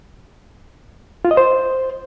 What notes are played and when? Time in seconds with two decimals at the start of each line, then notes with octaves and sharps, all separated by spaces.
1.25 F4
1.31 D#5
1.37 C5